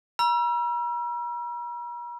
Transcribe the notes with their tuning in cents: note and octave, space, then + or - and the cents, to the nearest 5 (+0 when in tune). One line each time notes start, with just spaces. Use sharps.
A#5 +45 E6 +35